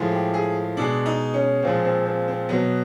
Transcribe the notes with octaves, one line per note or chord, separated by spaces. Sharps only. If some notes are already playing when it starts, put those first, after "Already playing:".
Already playing: A2 F3 G#3
G4
G#4
B2 G#3 D4
D#4
C#4
A#2 F3 G#3 C4
C4
C4
C4
B2 F#3 B3